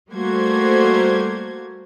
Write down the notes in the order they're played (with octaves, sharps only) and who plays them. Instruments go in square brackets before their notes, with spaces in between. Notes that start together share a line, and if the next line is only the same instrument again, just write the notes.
[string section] G3 A3 A#3 F#4 C5 G#6